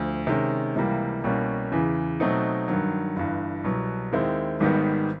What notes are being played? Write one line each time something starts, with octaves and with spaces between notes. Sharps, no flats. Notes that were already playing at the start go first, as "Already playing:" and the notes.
Already playing: D2 F3
C3 D#3 G#3 C#4
C#2 C3 E3 G3 A#3
C2 B2 G3 A#3 C#4
E2 C#3 E3
B2 F#3 A3 C4 D#4
G2 D#3 F#3
G1 G2 E3
C2 B2 F#3 B3
D#2 D#3 G#3 C4 E4
G#1 G#2 D#3 G3 B3